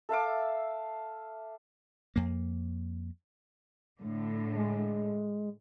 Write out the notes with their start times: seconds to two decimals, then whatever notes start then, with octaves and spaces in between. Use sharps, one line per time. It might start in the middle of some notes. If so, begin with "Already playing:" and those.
0.09 A4 E5 F5 D6
2.16 F2 A#3
3.99 A2 D3
4.55 G#3